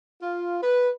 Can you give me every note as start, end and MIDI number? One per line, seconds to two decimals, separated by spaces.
0.23 0.59 65
0.62 0.90 71